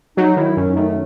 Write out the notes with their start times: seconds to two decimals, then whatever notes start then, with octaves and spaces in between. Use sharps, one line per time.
0.17 F#3 D#4
0.36 D#3 E4
0.56 F#2 C#4
0.76 D#3 A3